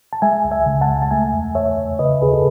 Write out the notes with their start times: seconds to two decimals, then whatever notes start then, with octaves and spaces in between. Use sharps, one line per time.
0.13 A5
0.22 G#3 E5 G#5
0.44 C#2
0.51 E5 G#5
0.66 C#3
0.81 F#5 A5
0.89 C#2
1.02 A5
1.11 A3 E5 G#5
1.34 E2
1.55 E2 C#5 E5
1.78 E2
1.99 C#3 B4 D#5
2.21 D#2 G#4 B4
2.33 A4